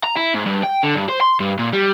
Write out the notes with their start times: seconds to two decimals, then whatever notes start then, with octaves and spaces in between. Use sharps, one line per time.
0.04 A#5
0.17 E4
0.35 G#2
0.46 G2
0.64 G5
0.84 D3
0.96 G2
1.09 C5
1.21 C6
1.40 G2
1.59 A#2
1.73 G3